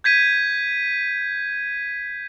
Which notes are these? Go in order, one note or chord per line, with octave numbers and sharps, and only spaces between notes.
G6 G#6 B6 D#7